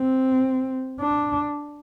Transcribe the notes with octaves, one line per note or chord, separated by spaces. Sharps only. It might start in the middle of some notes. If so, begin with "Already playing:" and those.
Already playing: C4
D4